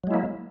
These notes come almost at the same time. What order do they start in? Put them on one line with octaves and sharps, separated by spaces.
F#3 G#3 E4 A#3